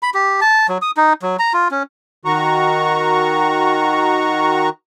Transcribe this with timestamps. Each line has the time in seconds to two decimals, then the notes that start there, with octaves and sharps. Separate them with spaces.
0.03 B5
0.14 G4
0.41 A5
0.69 F#3
0.82 D#6
0.97 D#4
1.22 F#3
1.39 A#5
1.53 F4
1.71 C#4
2.25 D#3 F#4 A#5 C#6